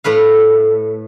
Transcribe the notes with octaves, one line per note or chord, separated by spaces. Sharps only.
A2 A3 B4 F5